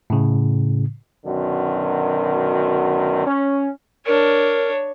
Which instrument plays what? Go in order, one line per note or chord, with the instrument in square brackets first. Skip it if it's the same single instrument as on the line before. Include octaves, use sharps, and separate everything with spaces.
[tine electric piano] A2 C#3
[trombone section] F#2 B2 D3 D#3
C#4
[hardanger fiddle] D4 C#5 [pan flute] A#4